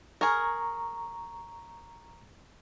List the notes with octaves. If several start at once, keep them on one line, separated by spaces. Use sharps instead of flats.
G#4 A#4 A#5 C#6